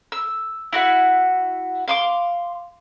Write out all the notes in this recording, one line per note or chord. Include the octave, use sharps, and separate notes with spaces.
E6
E4 F#4 F#5
F5 C6 D6